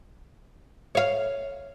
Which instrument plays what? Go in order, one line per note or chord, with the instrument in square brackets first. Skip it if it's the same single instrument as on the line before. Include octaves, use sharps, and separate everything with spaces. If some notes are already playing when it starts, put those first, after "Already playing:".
[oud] C#5 F5